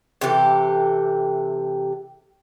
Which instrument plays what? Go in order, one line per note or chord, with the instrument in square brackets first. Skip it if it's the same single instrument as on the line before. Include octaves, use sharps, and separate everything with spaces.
[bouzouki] C3 E3 G4 A4